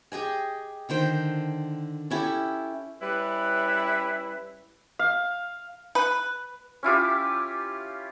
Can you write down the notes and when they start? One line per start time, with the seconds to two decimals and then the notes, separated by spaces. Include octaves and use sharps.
0.12 G4 G#4 D#5 G#5
0.89 D3 D#3 C5 G5
2.10 C#4 E4 G4 A4
3.00 G3 C#4 E4 B4
4.99 F5
5.95 B4
6.83 C#4 E4 F4 G4